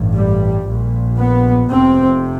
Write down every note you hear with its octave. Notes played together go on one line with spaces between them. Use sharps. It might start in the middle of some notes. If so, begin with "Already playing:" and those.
Already playing: A1 G2
G3
A#1 A#2
B3
F1 F2 C3 C4